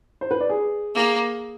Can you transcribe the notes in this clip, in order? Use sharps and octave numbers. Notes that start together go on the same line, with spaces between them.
C5
B4
D5
G#4
A#3 G#4